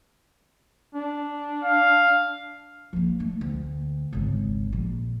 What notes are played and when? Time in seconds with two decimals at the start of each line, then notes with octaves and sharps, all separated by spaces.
0.94 D4
1.64 F5
2.93 F3 A#3
3.19 A3 D4
3.41 D2
4.13 G#1 C#2
4.73 A#1